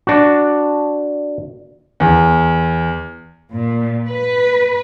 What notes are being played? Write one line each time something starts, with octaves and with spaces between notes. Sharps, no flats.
D4 F#4
E2
A#2
B4